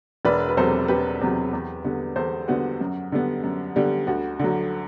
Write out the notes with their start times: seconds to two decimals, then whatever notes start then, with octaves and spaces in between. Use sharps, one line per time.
0.25 E1 B4 D5
0.49 B4
0.57 E2 C3 F#3 A4 C5
0.88 E1 G4 B4
1.21 E2 C3 F#3
1.53 E2
1.85 D3 G3 B3
2.16 E2 A4 C5
2.48 D3 G3 B3 F#4
2.81 F#2
3.12 D3 G3 B3
3.43 F#2
3.76 D3 G3 B3
4.07 D2 F#4
4.39 D3 F#3